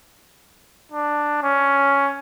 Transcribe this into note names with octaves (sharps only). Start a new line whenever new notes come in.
D4
C#4